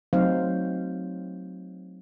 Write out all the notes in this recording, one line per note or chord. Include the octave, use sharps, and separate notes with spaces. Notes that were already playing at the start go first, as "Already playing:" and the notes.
F#3 A3 C4 D#4 C5 F5